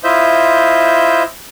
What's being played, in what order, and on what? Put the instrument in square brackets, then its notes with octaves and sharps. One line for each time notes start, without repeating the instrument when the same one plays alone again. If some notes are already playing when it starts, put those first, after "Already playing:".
[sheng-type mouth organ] E4 F4 C5 D#5 E5 G6